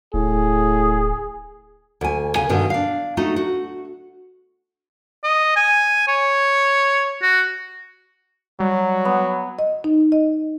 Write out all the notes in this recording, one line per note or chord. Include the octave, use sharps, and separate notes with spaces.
D1 A2 G#4
D2 G#5
C#3 G#5
G2 B2 D3 D#3
D4 F5
A3 D#4 F#4
F#4
D#5
G#5
C#5
F#4
F#3 G3
B3
D#5
D#4
D#5